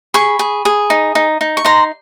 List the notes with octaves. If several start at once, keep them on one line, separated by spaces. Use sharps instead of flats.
G#4 B5 C#6
G#4
G#4
D#4
D#4
D#4
C#6
D#4 A#5 C6